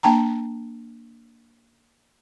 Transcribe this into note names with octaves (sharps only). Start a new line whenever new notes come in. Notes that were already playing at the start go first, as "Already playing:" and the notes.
A#3 D4 G5 A5 A#5